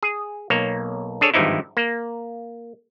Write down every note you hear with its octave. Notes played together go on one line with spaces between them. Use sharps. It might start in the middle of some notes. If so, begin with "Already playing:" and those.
G#4
B1 A#3 C#5
D4 G#4 A4 C#5
G#1 G2 E3 F3 D#4 E4
A#3